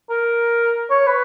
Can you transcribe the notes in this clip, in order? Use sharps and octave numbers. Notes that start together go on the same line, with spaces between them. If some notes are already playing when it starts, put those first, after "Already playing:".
A#4
C#5
B4